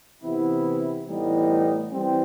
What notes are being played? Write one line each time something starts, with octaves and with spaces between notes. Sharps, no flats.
C3 E3 B3 E4
A2 E3 G3 B3 D#4
E3 G3 C4